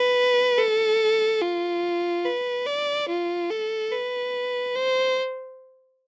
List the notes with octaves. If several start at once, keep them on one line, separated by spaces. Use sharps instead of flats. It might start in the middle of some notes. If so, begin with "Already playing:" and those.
Already playing: B4
A4
F4
B4
D5
F4
A4
B4
C5